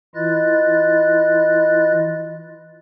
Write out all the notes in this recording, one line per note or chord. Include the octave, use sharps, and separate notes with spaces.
E3 E4 F4 D#5 F#6 A6